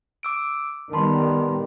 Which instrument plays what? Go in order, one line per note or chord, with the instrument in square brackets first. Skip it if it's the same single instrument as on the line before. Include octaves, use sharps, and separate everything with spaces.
[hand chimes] D6 E6 D7
[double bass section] D#3 G3 B3 [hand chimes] A5 B5 C6